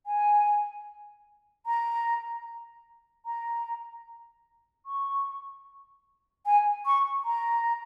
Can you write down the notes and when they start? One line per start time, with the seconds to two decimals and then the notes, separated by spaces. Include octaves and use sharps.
0.06 G#5
1.66 A#5
3.26 A#5
4.86 C#6
6.46 G#5
6.86 C#6
7.25 A#5